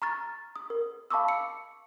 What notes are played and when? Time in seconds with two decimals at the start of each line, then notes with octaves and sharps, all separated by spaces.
0.02 A#5 C#6 F6 A6
0.56 D#6
0.70 A#4
1.11 F5 A5 B5 C#6 D6 E6
1.28 C#7